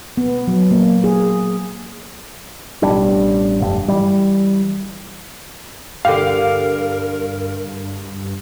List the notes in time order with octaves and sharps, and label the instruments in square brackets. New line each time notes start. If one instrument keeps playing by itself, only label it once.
[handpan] B3
F#3
A#3
G#4
[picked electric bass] A1 B2 G3 D4
F1 G2
E3 G3
[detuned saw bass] G2 [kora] D3 G4 [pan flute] A#4 [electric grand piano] F5